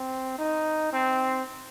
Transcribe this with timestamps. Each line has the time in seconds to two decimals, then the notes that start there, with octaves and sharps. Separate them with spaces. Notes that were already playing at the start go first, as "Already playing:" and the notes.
Already playing: C4
0.38 D#4
0.93 C4